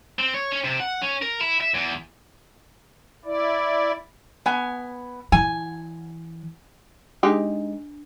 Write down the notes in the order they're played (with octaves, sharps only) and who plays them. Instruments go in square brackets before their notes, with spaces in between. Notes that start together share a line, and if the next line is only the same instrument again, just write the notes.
[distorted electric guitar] C4
C#5
C#4
C3
F#5
C#4
A#4
E4
E5
E2
[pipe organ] E4 D5
[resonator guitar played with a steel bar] B3 G#5
[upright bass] E3 [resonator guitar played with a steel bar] G#5
[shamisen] G#3 D#4 G4 [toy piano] D4